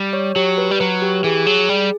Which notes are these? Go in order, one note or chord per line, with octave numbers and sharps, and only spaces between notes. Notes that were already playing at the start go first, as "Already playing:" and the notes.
Already playing: G3
C#5
F#3 G4
B4
G3
F#3 B4
G4
E3 G#4
F#3 G#4
G3 G#4